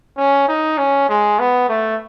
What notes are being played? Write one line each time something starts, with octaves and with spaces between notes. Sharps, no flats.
C#4
D#4
C#4
G#3
B3
A3